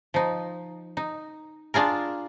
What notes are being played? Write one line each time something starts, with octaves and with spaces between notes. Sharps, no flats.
F3 D#4
D#4
D4 F4 G#4 A#4